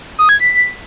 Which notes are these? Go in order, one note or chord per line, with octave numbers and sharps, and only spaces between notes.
D#6
G#6
B6